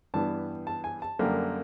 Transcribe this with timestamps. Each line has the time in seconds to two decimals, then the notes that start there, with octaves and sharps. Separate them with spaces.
0.14 G2 E3 G3 B3 A5
0.67 A5
0.84 G#5
1.02 A5
1.19 F#2 D3 G3 A#3